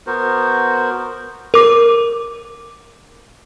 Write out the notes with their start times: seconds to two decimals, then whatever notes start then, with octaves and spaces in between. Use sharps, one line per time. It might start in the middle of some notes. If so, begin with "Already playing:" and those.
0.07 B3 F#4 A#4 C5
1.54 A#4 D6